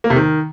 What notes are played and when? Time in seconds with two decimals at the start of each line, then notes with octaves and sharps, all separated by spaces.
0.04 A#3
0.10 C3
0.16 D#3